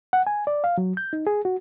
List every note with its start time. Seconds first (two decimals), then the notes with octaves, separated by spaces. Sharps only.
0.13 F#5
0.27 G#5
0.47 D5
0.64 F5
0.78 F#3
0.97 G6
1.13 D#4
1.27 G#4
1.45 F#4